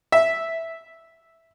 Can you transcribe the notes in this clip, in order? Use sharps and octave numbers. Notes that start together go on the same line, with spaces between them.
E5